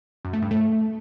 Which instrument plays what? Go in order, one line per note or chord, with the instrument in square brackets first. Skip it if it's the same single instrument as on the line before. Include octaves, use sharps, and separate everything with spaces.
[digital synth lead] F#2
A3
G2
A3